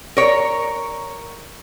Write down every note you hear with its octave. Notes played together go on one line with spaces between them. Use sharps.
A#4 C#5